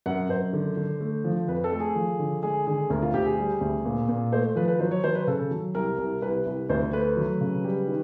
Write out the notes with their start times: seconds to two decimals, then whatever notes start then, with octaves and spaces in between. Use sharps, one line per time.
0.06 F#2 F#5
0.29 F#2 C5
0.53 D3
0.77 D3
1.01 A3
1.24 F3
1.48 F2 B4
1.64 A4
1.72 A3
1.80 G#4
1.95 F3
2.19 D3
2.43 G#3 G#4
2.67 D3 G#4
2.90 D2 A#4
3.02 F4
3.14 D2 G4
3.26 G#4
3.38 G3
3.61 D2
3.85 A#2
4.09 A#2
4.32 A3 C5
4.56 F3 B4
4.68 B4
4.80 F#3 C5
4.91 C#5
5.04 F#3 C5
5.15 B4
5.27 C#3 A4
5.51 F#3
5.75 C2 A#4
5.98 C2
6.22 C2 B4
6.46 C2
6.69 D2 C5
6.93 A3 B4
7.17 F#3
7.41 C#3
7.64 G3
7.88 D#3